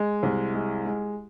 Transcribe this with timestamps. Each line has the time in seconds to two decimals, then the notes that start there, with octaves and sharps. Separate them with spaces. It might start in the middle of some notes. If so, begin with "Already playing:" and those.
Already playing: G#3
0.23 C2
0.54 G#3
0.85 G#3